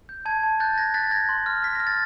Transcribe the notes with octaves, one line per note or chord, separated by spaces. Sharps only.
G6
A5 G#6
A5
F#6 G6 A6
F#6 G#6 A#6
F#6 A6 B6
F#6 G#6 A#6
C6
F6
F6 B6
F6 A#6
A6